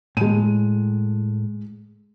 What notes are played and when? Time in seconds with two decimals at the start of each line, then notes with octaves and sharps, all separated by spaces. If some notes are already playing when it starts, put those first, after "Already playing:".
0.17 A2 G#3 D#7